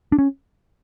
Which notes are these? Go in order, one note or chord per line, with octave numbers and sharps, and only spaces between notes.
D4
C#4